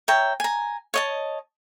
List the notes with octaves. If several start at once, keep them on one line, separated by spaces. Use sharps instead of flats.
C#5 E5 G5 A#5
G#5 A#5
C#5 D#5 A5